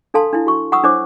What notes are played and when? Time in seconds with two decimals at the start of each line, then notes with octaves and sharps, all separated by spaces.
0.14 D4 A4 F5 A5 C6
0.33 D4 E4
0.47 F#4 C#6
0.72 F#5 A#5 C#6 D#6 E6
0.84 D4 E4 C5 C#5 D6